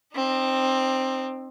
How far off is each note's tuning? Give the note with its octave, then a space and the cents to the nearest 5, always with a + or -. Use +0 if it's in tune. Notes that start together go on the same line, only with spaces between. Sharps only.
C4 +10 D#4 -30